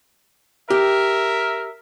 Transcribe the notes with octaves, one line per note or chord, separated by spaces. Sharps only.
G4 A#4 E5